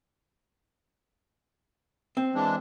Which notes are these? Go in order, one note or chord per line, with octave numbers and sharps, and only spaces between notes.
C4
E3 G#3 D4